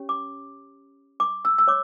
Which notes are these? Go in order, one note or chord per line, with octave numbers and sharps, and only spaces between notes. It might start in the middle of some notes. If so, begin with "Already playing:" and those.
Already playing: C#4 G4 C#5
D6
D6
E6
E6
C#5 D6